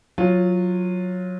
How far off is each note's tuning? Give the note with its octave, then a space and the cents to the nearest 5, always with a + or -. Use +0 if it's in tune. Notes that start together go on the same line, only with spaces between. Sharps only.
F#3 -15 F4 +0